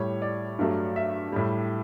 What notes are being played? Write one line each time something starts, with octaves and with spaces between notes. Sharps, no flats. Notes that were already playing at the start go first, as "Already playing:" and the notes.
Already playing: A2 G3 C#5
D5
G2 F#3 A3
E5
A2 G3